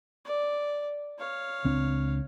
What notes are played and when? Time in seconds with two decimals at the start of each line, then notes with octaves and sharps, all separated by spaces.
0.25 D5
1.18 C#5 F5
1.65 C#2 C4 D4